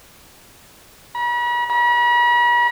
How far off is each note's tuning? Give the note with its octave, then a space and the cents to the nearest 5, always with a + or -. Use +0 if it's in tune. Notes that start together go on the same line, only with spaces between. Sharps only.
B5 -45
B5 -45